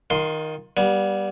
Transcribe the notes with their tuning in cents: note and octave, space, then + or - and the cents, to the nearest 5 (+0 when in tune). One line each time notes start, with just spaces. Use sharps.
D#3 +5 F4 +30 C6 +0
G3 -5 B3 -35